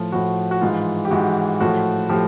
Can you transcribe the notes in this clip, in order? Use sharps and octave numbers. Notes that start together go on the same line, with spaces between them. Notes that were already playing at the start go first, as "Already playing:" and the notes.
Already playing: A2 F3
A2 F3 F#4
F#4
G#2 E3 F4
G4
G#2 E3 F#4
A2 F3 F#4
A2 F3 G4